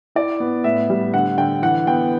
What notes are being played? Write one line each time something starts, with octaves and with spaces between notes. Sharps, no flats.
E4 D5
B3
A2 E5
G3
D3 F#5
D3 G5
E3 F#5
B3 G5